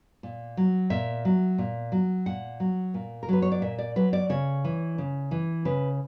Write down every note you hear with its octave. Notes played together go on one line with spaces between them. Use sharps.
A#2
F#3
A#2 E5
F#3
A#2
F#3
A#2 F#5
F#3
A#2
A#4
F#3 B4
C#5
D5
A#2 E5
D5
F#3 B4
D5
C#3 C#5
E3
C#3
E3
C#3 B4